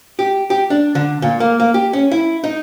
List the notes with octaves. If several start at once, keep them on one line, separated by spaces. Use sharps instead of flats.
G4
G4
D4
D3
A#2
A#3
A#3
G4
C#4
E4
D#4